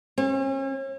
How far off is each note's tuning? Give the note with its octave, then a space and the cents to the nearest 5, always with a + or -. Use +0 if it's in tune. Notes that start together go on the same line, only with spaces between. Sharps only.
C#4 -40